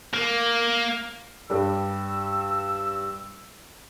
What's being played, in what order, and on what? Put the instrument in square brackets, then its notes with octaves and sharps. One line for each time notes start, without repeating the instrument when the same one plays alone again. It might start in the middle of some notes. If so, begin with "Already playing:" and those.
[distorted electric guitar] A#3
[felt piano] G2 G3 [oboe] E6